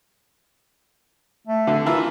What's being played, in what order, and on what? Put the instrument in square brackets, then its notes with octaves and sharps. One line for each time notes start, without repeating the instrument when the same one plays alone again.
[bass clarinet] A3
[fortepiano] D3
[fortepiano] E3 E4 F4 [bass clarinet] A#4